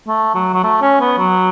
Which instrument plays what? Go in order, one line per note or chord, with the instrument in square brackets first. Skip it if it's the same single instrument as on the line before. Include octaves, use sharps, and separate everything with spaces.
[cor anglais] A3
F#3
F#3
A3
C#4
B3
F#3